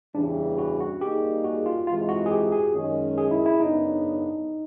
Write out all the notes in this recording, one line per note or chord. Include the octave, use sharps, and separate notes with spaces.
E2 C#3 E3 G3 D4
F#4
F#4
G3 A#3 D#4 G4 G#4
F#4
F4
C3 E3 G#3 F4
F#4
G#4
G4
G#4
F#2 D#3 G#3 C#4
G#4
E4
E4
F#2 C#3 F#3 B3 D4 D#4